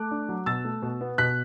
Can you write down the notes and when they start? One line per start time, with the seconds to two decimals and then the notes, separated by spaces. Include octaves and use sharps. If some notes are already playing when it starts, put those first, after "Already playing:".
Already playing: A3 D6 F#6
0.11 D4
0.29 F#3
0.46 B2 E6 A6
0.65 A3
0.82 B2
1.01 B3
1.18 B2 F#6 B6